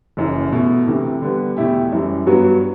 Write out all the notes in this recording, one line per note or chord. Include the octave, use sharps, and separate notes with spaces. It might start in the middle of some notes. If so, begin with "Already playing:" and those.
F#1 F#2 E3
B2 A3 E4
D2 C3 E3
D3 G3 B3
E2 B2 A3 E4 G4
F#2 E3 G3
G2 F#3 B3 F#4